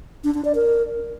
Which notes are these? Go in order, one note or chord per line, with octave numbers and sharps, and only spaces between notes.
D4
D4
D5
A#4